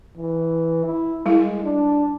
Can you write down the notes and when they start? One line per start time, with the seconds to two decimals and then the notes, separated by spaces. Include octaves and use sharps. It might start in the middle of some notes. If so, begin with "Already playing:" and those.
0.17 E3
0.85 E4
1.26 G3 G#3 E4
1.64 D4